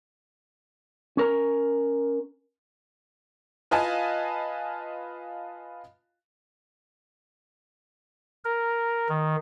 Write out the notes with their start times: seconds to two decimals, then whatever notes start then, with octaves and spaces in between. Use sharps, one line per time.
1.17 C#4 A#4 A#5
3.71 F4 B4 D#5 F5 G#5 A5
8.45 A#4
9.09 D#3